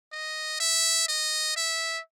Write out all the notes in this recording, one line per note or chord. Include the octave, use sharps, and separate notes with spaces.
D#5
E5
D#5
E5